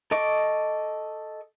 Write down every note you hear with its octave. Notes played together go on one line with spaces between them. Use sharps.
A4 D#5 C#6 D6